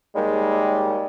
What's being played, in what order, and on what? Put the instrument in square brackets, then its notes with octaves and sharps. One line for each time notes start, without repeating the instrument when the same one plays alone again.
[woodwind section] D#2 G3 [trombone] G#3